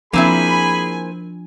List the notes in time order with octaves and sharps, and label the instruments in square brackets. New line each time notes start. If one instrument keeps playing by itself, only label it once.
[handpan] F3 D4 [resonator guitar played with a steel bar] A#3 C4 E4 [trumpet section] G#4 B5 [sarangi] G#5